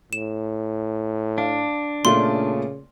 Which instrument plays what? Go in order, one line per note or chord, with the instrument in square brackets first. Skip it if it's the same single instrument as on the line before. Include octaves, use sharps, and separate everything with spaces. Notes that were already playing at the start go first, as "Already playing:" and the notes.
[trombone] A2 [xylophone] E7
[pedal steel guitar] D4 [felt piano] F5
[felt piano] A#2 A3 F4 [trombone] C#3 [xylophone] C6